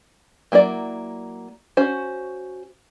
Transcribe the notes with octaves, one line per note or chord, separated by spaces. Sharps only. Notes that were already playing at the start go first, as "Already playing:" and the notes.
F#3 A#3 E4 D5
C#4 F#4 C5